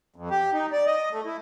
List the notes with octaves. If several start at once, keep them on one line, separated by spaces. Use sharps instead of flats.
F2
G4
D#4
D5
D#5
A3
E4